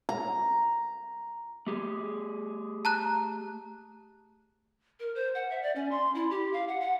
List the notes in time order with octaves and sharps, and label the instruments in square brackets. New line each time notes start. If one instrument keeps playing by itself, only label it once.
[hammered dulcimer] A#5
[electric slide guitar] A3 G4 G#4
[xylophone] A5 A#5 F#6
[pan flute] A#4
C5
F#5
E5
D5
C#4
C6
E4
G4
F5
F#5
F#5